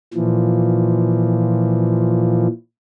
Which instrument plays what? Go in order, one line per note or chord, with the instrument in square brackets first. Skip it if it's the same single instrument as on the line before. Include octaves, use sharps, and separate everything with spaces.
[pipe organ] A#2 E3 F3